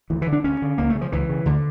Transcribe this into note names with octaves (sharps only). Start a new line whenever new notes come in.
D2 E3
E3
D3
D4
D2 C#4
D3
C#2 A#3
A3
C#3
F3
C#2 E3
C#3
D2 D3